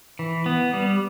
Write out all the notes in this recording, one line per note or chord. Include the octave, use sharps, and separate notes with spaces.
E3
B3
G3